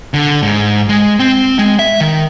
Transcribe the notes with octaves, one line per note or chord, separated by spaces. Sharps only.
D3
G#2
G#3
C4
G#3
E5
D#3